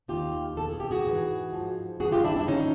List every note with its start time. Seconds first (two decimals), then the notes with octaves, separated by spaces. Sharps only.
0.08 D#2 D#3 F4 G4
0.57 E2 B2 A4
0.69 G#4
0.80 G4
0.91 F#4 G#4
1.04 G#2 E3
1.53 G#2 F3
2.00 G2 E3 F#4 G#4
2.12 F4 G4
2.24 D4 E4
2.36 D4 E4
2.47 G#2 D#3 C#4 D#4